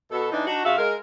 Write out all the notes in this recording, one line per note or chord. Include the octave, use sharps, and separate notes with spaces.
B2 A4
E3 D4 D#4
D4 D#4 F#4
C#3 F4 F#4 E5 F5
G#3 A#4